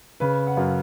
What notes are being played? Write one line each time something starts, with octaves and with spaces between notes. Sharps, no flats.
C#3 B4
F#5
F#2 F5